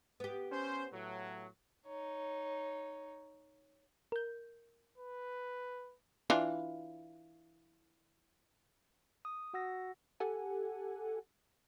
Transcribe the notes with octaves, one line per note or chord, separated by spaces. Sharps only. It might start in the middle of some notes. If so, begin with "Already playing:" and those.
B3 G4
C#4 C5
A2 F#3
D#4 C#5
A#4 G6
B4
E3 D4 F4
D#6
F#4 F#5 E6 A#6
G4 A4 F#5 G#5